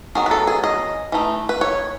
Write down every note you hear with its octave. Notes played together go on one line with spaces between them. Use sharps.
D#3 F#3 B3 G#4
B4
A4
G#4
D#5
E3 A3 D#4
B4
C#5